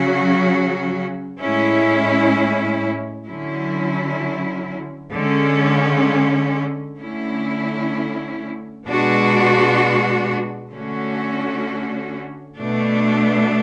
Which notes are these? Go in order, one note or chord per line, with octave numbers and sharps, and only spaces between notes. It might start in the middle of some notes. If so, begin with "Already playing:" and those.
Already playing: C#3 F#3 C#4 F#4
A2 G#3 C#4 E4
D3 F#3 C#4 E4
D3 G#3 C#4
D3 A3 C#4 E4
B2 G#3 D4 F#4
D3 A3 C#4 F#4
B2 A3 D4